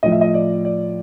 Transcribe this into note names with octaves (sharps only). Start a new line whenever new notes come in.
A2 F3 D#5
E5
D#5
D5
D5